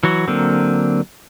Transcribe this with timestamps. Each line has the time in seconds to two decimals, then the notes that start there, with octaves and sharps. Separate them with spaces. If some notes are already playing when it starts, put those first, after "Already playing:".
0.03 E3 F#3 F#4
0.28 D3 F#3 A#3 C4